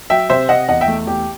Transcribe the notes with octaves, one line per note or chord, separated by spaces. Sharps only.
F#3 E5 G5
C3 C5 E5
C3 D#5 F#5
E2 D#5 F#5
E5 G5
A3
E2 G4